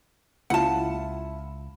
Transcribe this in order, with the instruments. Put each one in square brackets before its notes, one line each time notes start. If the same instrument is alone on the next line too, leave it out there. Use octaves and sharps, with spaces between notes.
[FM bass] C#2 [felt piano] E4 F4 [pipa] F#5 A5